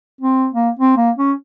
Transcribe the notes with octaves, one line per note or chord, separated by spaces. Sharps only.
C4
A#3
C4
A#3
C#4